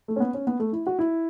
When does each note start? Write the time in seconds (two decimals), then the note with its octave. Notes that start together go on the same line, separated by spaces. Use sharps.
0.08 A3
0.16 C#4
0.20 B3
0.34 C#4
0.47 B3
0.60 A3
0.72 E4
0.87 F#4
0.99 E4